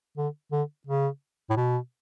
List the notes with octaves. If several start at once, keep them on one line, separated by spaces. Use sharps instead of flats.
D3
D3
C#3
A2
B2